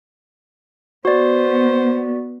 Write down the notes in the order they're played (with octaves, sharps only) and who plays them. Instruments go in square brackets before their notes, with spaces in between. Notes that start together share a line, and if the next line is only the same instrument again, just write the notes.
[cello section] B3 [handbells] F#4 D5 [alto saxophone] C5